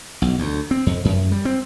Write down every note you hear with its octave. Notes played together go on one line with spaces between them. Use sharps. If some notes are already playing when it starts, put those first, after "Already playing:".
B1
D2
C4
F2
F#2
G3
C4